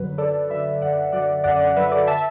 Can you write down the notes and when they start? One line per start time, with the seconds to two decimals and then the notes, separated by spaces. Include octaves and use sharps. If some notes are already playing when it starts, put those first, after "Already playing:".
Already playing: F#2 D3 F#3 B4
0.18 F#2 A4 D5
0.50 D3 F#3 B4 E5
0.81 F#2 D5 F#5
1.12 D3 F#3 D5 F#5
1.44 F#2 D5 F#5
1.60 D5 F#5
1.76 D3 F#3 B4 E5
1.92 A4 D5
2.07 E5 A5